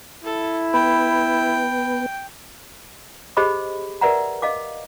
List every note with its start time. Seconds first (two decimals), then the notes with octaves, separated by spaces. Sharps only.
0.24 E4 A4
0.74 B3 G5 B5
3.37 G4 G#4 C5 D#5 B5 D6
4.01 A#4 B4 D5 E5 F#5 A#5
4.42 D#5 F5 D6